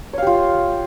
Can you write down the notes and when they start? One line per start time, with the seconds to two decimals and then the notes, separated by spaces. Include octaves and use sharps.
0.13 C#5
0.18 F5
0.22 G4
0.27 F4